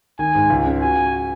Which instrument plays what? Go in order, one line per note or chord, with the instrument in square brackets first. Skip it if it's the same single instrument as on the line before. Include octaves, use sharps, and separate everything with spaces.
[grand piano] D#3 [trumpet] G#5
[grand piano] G#2
C#2
C#3
[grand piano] F#4 [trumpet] G#5
[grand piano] F#4